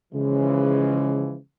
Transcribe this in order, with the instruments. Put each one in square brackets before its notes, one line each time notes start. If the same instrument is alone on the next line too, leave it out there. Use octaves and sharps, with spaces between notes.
[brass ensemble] C#3 E3 F3 G#3